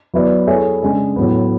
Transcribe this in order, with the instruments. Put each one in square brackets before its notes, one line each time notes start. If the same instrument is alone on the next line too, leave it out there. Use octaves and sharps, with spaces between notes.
[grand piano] F#3 B3 E4 B4 D5
A3 E4 G#4 C#5 E5
C#3 G#3 D4 G#4
A2 F#3 B3